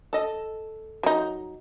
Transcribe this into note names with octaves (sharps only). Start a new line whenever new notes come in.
A4 D#5
F#3 D#4